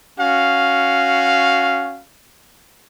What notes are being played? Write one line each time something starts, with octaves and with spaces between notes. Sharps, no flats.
C#4 F#4 F5